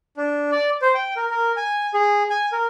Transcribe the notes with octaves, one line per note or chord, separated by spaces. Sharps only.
D4
D5
C5
G5
A#4
A#4
G#5
G#4
G#5
A#4